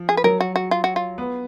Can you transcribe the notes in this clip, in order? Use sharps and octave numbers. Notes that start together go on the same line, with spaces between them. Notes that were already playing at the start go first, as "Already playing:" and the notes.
Already playing: F3
G#4
B4
F#3 A#4
F#4
F#4
F4
F#4
F4
B3